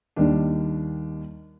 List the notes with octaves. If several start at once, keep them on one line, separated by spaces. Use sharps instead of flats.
D#2 D#3 G3 D4